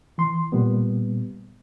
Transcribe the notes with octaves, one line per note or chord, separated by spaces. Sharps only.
E3 C6
A#2 G3 B3